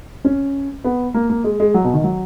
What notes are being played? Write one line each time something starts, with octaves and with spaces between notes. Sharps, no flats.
C#4
B3
A#3
A#3
G#3
G#3
F#3
B2
D#3
F#3